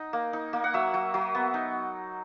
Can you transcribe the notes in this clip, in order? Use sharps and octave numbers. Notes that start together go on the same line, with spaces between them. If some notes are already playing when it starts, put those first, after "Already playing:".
Already playing: D#4 F#5
A#3
D#4
A#3
F#5
F#3 E5
F#3
F#3
B3
D#4